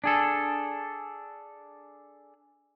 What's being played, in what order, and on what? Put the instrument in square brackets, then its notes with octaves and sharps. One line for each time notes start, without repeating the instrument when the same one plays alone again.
[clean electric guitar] D4 G#4 A4